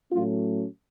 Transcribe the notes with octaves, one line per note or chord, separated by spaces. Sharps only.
A2 F#3 A3 C#4 F4